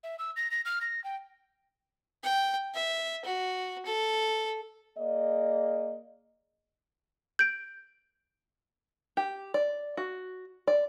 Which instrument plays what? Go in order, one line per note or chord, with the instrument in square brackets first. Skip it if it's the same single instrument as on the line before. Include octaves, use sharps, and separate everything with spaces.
[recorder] E5
E6
A#6
A#6
F6
A#6
G5
[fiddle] G5
E5
F#4
A4
[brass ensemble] A#3 G#4 D5 D#5
[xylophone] G6 D7
[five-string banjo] G4
D5
F#4
D5